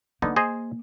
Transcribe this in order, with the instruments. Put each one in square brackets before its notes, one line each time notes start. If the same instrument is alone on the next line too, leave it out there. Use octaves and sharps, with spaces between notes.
[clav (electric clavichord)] D3 B3 D#4 [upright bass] A#3
[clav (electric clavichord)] G#4 C5 D#5